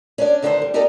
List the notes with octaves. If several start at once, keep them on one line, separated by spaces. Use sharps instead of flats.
C#4 D4 D5
E2 D3 D#3 A3 A4 C5
G3
D#4 G4 A4 A#4 D5 D#5